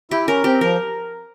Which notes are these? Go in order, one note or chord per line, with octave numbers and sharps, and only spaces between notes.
E4 G4
C#4 A#4
C4 G4
F3 A#4